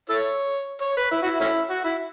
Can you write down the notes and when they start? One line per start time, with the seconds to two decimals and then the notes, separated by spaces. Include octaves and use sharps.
0.09 E4 A4 C#5
0.82 C#5
0.97 B4
1.11 E4
1.22 F#4
1.26 E4
1.40 A3 C#4 E4
1.69 F#4
1.84 E4